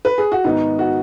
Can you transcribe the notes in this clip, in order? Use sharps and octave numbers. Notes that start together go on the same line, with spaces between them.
B4
G#4
F#4
G#2 D#3 B3 D#4
F#4